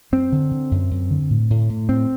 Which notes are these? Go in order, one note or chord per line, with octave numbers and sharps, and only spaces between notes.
F#2 C4
D3
D3
F#2
F#2
D3
A2
A2
A2
A2 C4